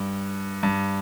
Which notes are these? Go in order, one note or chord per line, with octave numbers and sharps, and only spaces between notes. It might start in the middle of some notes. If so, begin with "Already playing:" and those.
Already playing: G2
G2